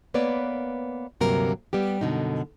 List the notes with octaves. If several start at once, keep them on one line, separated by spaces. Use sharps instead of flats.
A#3 B3 B4 C#5 D5
D2 G2 C3 F#3 A#3 A#4
G3 B3 G4
F#2 B2 D3 D#4